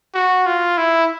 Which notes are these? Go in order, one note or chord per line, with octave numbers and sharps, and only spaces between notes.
F#4
F4
E4